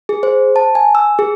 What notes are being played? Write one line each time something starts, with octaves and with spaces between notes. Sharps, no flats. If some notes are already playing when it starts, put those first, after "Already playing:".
G#4
C5
A5
G#5
E6
G#4